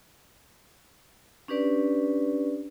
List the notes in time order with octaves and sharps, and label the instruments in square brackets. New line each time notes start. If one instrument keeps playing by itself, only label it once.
[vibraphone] C#4 D4 G4 B4 D5